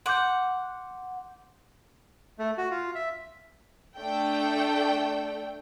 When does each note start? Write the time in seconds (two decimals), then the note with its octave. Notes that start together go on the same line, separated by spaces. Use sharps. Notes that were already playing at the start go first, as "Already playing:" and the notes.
0.06 F#5 C6 D6 G6
2.39 A3
2.58 F#4
2.71 F4
2.95 E5
3.97 A3 D4 A4 G5